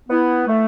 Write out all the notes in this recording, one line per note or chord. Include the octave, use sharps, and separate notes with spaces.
B3 E4
A3